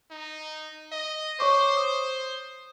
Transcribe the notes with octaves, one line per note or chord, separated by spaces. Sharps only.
D#4
D#5
C5 C#5 C#6 D6
D#6